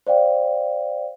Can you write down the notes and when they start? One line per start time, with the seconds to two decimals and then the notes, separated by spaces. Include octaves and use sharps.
0.07 C5 D5 F5 G5